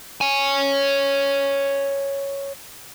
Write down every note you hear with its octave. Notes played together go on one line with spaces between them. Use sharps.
C#5 G#5